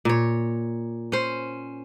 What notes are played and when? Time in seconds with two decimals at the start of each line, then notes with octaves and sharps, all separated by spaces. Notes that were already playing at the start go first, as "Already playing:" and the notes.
0.05 A#2 C#5
1.12 C#4 C5